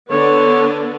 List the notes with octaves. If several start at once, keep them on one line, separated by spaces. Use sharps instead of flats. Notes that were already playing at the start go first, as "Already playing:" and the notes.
D3 B3 D4 C#5